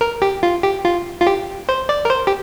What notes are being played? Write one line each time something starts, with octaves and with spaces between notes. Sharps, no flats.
A#4
G4
F4
G4
F4
F4
G4
C5
D5
A#4
C5
G4